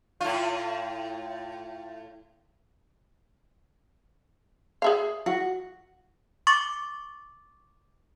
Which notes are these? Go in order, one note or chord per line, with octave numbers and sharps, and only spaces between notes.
A2 F4
G#4 E5 F5
F#4
C#6 D6 A6